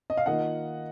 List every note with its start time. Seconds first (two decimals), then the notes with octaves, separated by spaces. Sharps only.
0.10 D#5
0.17 F5
0.26 D#3 A#3 F4 D#5 F#5